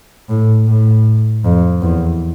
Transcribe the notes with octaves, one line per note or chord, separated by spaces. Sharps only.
A2
A2
F2
E2